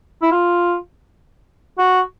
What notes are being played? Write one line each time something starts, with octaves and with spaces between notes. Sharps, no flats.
E4
F4
F#4